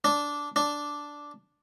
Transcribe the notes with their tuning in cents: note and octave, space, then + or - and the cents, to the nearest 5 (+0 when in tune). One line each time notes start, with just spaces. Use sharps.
D4 -10
D4 -5